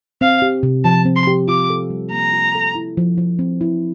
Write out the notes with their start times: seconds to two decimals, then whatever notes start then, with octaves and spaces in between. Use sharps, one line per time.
0.21 C4 F5
0.42 G4
0.63 C3
0.84 F3 A5
1.05 C4
1.16 C6
1.27 G4
1.48 F4 D6
1.70 A4
1.90 G3
2.12 A#3 A#5
2.33 F4
2.55 A4
2.75 E4
2.97 F3
3.18 F3
3.39 C4
3.61 E4